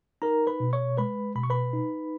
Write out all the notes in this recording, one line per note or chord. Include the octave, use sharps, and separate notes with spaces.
D#4 A#4 A#5
B4 B5
B2
C#5 C#6
G#3 B4 B5
B2 B5
C#6
B4 B5
D#4